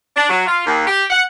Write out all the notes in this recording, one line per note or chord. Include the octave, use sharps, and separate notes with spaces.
D4
F#3
F4
D#2
G4
F#5